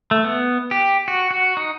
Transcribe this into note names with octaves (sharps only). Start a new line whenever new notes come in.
A3
B3
G4
F#4
F#4
D#4